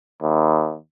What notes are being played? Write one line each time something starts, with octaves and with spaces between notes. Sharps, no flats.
D#2